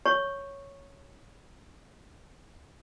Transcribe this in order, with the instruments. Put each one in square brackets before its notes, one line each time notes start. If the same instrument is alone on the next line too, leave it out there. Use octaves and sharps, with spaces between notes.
[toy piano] C#5 C#6